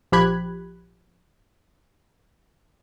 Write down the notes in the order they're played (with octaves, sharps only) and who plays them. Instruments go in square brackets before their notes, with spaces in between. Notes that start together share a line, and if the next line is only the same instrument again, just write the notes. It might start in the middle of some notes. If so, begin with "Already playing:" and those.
[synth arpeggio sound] A#1 F3 G4 B5 F#6 G#6